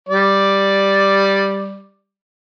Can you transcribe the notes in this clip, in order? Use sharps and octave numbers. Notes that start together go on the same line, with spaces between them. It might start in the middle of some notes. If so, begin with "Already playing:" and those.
G3 D5